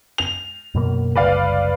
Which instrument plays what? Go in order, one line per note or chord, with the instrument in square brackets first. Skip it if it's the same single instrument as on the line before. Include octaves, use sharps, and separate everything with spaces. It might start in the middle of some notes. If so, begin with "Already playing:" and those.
[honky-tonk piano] F7
[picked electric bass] F#2 B2 A#3
[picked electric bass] F#1 C2 [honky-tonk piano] B4 D5 F5